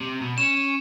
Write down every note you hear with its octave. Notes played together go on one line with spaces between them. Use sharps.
C3
B2
C#4 E7